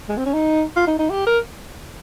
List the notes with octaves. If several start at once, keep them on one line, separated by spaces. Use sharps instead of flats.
G#3
C4
C#4
D#4
F4
D#4
D#4
G4
A#4